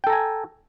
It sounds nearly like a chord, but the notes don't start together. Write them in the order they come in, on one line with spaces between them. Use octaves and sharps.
G5 A4 A#5 G#5